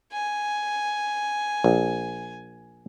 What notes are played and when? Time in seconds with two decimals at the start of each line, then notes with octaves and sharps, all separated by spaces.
0.12 G#5
1.64 A#1